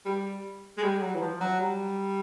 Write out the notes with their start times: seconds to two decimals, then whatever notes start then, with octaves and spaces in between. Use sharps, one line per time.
0.05 G3
0.78 G#3
0.83 G3
1.02 F#3
1.15 E3
1.21 F3
1.41 F#3
1.60 G3